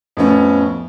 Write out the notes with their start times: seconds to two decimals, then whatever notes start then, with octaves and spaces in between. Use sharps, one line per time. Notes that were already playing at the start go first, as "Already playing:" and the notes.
0.17 F2 A2 B3 C#4